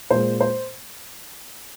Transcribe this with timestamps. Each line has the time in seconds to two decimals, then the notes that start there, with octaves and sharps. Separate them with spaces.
0.10 A#2 G#3 C5
0.41 C5